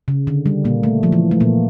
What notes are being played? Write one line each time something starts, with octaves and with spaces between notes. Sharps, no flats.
C#3
D3
G3
A#2 A#3
A3
F3
E3
A3
A#2 A#3